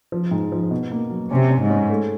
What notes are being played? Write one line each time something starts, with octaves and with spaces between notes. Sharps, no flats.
F3
G#2
F3
B2
A#3
F#3
C3 C#4
C#4
G#2
C#4
A3